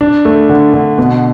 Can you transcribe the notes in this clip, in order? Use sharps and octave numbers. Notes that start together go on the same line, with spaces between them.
D4
A3
D3
D3
B2